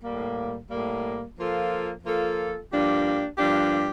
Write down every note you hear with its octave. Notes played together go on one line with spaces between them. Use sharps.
A2 G3 A#3
A2 G3 A#3
F3 A#3 F4 A4
F3 A#3 F4 A4
G2 F3 A#3 D4 G4
G2 F3 A#3 D4 G4